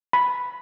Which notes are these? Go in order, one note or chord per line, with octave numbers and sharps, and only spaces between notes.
B5